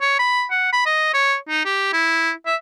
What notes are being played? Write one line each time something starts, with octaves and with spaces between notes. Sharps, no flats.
C#5
B5
F#5
B5
D#5
C#5
D#4
G4
E4
E5